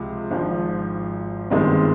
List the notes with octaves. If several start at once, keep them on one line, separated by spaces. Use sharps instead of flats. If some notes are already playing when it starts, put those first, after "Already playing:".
Already playing: C#2 C3 F3 G#3
G#1 G#2 F3
G1 G2 D#3 G#3 C4